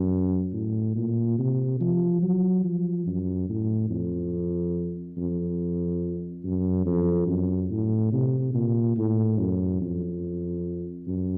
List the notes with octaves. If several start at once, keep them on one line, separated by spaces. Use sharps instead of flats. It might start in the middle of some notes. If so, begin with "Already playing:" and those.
Already playing: F#2
A2
A#2
C3
F3
F#3
F3
F#2
A2
F2
F2
F#2
F2
F#2
A2
C3
A#2
A2
F#2
F2
F#2